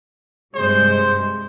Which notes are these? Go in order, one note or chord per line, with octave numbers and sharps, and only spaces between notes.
G2 C3 G#3 C5